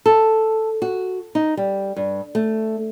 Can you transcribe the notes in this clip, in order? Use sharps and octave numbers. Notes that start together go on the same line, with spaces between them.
A4
F#4
D#4
G3
G2
A3